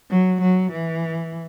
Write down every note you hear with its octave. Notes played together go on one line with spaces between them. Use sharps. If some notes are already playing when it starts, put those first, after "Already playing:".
F#3
F#3
E3